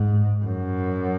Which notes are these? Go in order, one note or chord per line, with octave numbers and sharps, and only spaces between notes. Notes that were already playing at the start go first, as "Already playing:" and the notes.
Already playing: G#2
F#2